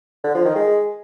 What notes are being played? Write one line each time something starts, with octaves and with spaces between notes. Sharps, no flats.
D3
F3
D#3
G#3